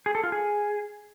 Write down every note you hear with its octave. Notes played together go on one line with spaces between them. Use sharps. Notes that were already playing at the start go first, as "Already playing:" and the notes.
G#4
A4
F4
G#4